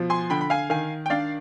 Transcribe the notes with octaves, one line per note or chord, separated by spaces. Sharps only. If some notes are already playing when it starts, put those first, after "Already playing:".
Already playing: B2 F3
G#5 C6
D3 G5 B5
B5
F5 G#5
D#3 F5 G#5
G5
D4 D5 F5